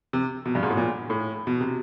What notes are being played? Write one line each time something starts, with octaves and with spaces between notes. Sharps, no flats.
C3
B2
G2
G#2
A2
A#2
A2
B2
C3